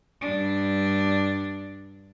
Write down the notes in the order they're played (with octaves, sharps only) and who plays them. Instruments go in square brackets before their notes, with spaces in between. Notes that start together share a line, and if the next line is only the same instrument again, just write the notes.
[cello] G2 D4